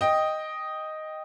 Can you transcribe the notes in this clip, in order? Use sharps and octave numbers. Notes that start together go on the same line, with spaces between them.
D#5 G5